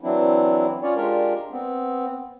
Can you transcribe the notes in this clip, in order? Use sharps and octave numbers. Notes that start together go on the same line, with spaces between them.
E3 F#3 C4 D4 E4
C#4 F4 C#5 D5
G#3 D4 F4 G4 A#4
B3 C4